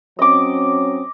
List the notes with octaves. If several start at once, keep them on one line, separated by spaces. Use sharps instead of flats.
F#3 C4 C#4 D#5 D6